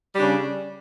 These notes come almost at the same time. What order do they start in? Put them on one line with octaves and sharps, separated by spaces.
G3 D4 C#3